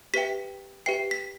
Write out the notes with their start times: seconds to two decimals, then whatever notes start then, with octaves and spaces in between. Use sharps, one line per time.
0.14 G4 B4 E5 G5 B6
0.86 G4 B4 E5 G5 C7
1.11 B6